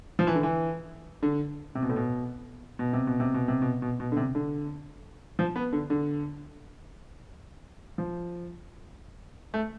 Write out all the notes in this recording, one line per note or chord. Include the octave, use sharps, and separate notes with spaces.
F3
E3
D3
E3
D3
C3
B2
A2
B2
B2
C3
B2
C3
B2
C3
B2
B2
B2
D3
C3
D3
F3
B3
D3
D3
F3
A3